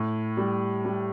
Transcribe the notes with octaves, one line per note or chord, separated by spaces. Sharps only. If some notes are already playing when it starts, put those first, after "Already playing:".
Already playing: A2
G3
G3